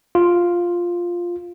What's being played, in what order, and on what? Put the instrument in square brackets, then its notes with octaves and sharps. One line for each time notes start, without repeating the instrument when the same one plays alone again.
[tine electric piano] F4